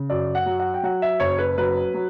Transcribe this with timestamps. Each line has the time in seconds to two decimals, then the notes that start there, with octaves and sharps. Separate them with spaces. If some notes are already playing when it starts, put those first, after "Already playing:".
Already playing: C#3
0.10 F#2 D5
0.35 F#5
0.46 F#3
0.59 F#5
0.74 G5
0.83 F#3 F#5
1.02 E5
1.20 F#1 C#5
1.39 B4
1.57 F#3 B4
1.94 F#3